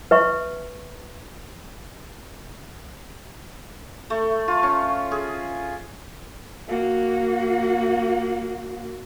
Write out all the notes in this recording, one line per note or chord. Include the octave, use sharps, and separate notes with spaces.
B4 E5 C#6
A3
F4
C#4
G#4
A#3 F#4